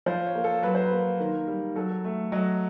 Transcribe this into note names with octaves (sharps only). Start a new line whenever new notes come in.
F3 C5
C#5
A#3
A4
F#3 B4
C5
B4
A#3
D#3 A#4
G3
F#3 A4
A3
F#3 D#5